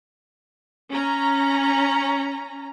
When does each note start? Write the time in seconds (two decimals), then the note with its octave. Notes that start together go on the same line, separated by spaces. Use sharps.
0.90 C#4 A#5